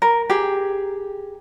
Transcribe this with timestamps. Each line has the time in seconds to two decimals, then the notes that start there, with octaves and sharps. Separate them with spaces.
0.02 A#4
0.30 G4 G#4